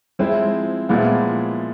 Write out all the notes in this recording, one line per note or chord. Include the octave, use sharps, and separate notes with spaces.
F3 G#3 C4 E4
A#2 F3 G#3 B3 E4